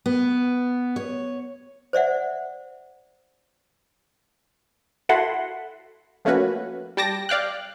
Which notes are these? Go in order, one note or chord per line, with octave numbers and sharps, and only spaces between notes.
B3
C#5
C5 D5 E5 F#5
E4 F#4 A4 F#5 B5 C6
F3 A3 A#3 C#4 F#4 B4
G3 G5 A5 D6 A#6
D5 F5 G5 F#6